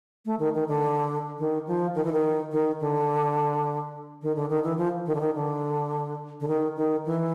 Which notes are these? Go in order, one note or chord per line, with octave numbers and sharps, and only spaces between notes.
A3
D#3
D#3
D3
D#3
F3
D#3
E3
D#3
D#3
D3
D#3
D3
D#3
E3
F3
D#3
D3
D#3
D3
D3
D#3
D#3
E3